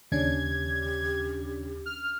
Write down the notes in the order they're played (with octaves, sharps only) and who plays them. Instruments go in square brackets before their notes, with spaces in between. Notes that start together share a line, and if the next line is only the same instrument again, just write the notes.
[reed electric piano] D#2 [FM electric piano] C#3 C#4 D4 [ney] G4 [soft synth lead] G#6
[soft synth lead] F6